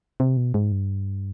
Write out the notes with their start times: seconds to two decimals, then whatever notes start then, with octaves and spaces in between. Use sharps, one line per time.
0.20 C3
0.37 B2
0.54 G#2
0.72 G2